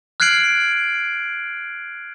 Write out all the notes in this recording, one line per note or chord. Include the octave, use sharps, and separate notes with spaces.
F6 F#6 G#6 C7 D7 F#7